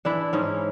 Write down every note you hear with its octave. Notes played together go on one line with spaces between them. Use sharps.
E3 D4 E4
G#2 C#4 D#4